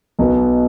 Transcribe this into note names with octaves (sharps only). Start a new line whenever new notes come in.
B1 B2 B3